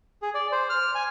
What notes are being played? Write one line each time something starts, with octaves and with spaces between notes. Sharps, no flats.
G#4
D5
C5
F6
G#5